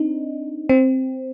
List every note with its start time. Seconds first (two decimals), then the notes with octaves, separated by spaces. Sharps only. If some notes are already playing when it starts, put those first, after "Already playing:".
Already playing: C4 D4 D#4
0.69 C4